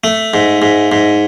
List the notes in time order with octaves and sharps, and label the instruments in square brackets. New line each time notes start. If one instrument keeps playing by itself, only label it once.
[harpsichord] A3
G#2
G#2
G#2